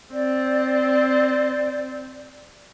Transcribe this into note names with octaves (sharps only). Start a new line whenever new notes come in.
C4 D5